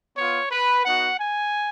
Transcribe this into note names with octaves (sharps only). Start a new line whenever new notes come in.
B3 F4 C#5
B4
B3 D#4 F#4 F#5
G#5